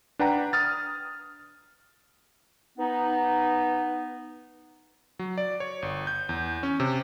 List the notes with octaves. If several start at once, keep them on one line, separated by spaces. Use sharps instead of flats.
D4 B4 F#5 G5 A#5
D#6 F6 A6
B3 D#4
F#3
D5
C#5
G1
G6
E2
C#4
C3